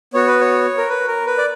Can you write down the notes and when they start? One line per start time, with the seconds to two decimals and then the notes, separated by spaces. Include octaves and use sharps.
0.14 B3 F#4 C#5
0.27 B4
0.41 C#5
0.77 A#4
0.89 B4
1.08 A#4
1.26 B4
1.38 D5